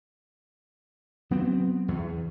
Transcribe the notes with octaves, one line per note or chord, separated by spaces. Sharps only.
F#3 B3 C4
E2